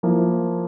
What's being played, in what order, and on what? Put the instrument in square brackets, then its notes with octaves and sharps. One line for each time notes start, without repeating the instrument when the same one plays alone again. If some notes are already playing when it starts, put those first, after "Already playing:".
[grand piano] F3 A#3 E4